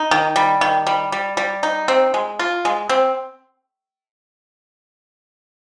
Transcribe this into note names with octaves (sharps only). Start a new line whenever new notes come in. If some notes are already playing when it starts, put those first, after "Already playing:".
Already playing: D#4
D#3
G3
D#3
G3
G3
G3
D#4
C4
G#3
F4
G#3
C4